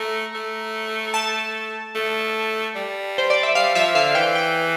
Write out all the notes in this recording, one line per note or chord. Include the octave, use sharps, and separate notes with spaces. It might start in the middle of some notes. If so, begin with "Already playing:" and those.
Already playing: A3 A#5
A3
A5
A3
G3
C5
D5
E5
G3 F5
F3 E5
D3 F5
E3 G5
G5